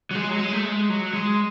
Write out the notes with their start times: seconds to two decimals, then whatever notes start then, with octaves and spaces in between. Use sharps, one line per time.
0.11 F#3
0.15 G#3
0.30 F#3
0.39 G#3
0.52 A3
0.65 G#3
0.89 F#3
1.13 G#3